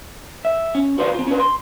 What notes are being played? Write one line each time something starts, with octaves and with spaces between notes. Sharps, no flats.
E5
C#4
F#4 B4 C5 D5 F5
C4 F4
C#4 D4 B4
C6